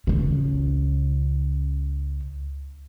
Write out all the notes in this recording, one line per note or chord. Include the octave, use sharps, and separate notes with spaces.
C#2 C#3